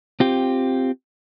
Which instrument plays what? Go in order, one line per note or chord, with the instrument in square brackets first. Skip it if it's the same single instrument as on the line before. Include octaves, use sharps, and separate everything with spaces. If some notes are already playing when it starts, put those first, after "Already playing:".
[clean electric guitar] C4 F4 G4